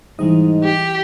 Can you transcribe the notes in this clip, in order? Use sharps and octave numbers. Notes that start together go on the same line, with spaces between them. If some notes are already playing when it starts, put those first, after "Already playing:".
G#2 E3 G3 D#5
G4